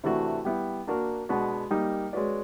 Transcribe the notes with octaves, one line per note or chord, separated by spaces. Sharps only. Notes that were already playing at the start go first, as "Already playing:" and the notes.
C3 E3 A3 D4 F#4
G3 B3 E4
A#3 D4 F#4 A#4
B2 G#3 B3 D4 F#4
G3 A#3 D#4
G#3 C#4 F#4 B4 D5